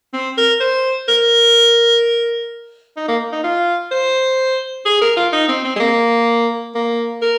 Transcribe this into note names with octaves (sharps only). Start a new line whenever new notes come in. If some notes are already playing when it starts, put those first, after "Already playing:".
C4
A#4
C5
A#4
D#4
A#3
D#4
F4
C5
G#4
A#4
F4
D#4
C4
C4
G#3
A#3
A#3
A#4